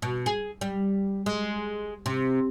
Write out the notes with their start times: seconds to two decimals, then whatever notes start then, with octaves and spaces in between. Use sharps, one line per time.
0.02 B2
0.26 G#4
0.61 G3
1.26 G#3
2.06 C3